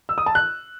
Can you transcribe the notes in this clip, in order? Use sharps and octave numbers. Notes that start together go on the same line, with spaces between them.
E6
D#6
A5
F#6